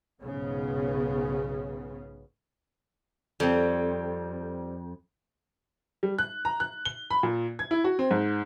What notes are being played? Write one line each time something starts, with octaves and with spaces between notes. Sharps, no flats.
B1 G#2 C#3 B3 C#4
F2 G3 C4
G3
F#6
A#5
F#6
G7
B5
A#2
G#6
E4
F#4
C4
G#2